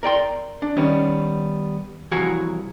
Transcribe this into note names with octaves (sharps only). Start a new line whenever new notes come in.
A#4 D5 G5 C6
D4
D#3 G3 B3 C#4
C2 E3 F3 F#4 G#5 A#5